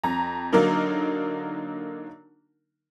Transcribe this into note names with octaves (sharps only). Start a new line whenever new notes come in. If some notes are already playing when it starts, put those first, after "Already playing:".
F2 A#5
D3 F#3 A#3 D4 D#4 A#4